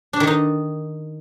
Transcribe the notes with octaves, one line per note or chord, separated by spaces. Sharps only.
D4
D#3
D#4